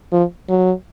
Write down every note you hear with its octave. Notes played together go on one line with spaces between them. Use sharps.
F3
F#3